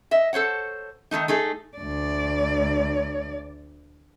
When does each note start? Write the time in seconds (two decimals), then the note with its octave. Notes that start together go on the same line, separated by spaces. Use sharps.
0.11 D#5 E5
0.33 A4 C5 C#5 F#5
1.11 D#3 F3 A3 D#4
1.28 A3 D#4 G#4 A4
1.77 D2 D5